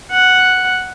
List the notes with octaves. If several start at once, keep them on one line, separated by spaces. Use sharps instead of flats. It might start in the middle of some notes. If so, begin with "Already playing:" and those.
F#5